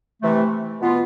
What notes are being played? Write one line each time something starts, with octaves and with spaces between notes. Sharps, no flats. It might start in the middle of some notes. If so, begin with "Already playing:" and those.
C3 E3 A3
B2 B3 F4